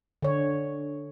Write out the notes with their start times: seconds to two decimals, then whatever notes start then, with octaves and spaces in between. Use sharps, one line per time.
0.22 D3 C#5